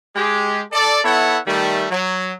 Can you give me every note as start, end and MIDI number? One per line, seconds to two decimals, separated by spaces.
0.16 0.62 56
0.16 0.62 67
0.73 0.99 69
0.73 0.99 74
1.04 1.39 59
1.04 1.39 64
1.04 1.39 69
1.04 1.39 73
1.04 1.39 76
1.04 1.39 78
1.46 1.85 51
1.46 1.85 55
1.46 1.85 57
1.91 2.33 54